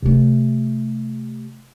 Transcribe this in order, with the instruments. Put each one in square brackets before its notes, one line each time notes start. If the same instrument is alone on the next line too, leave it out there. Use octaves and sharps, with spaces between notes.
[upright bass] C3 A3